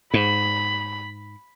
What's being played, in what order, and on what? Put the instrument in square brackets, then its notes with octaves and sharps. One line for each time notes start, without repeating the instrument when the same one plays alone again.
[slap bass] G#2 [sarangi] B5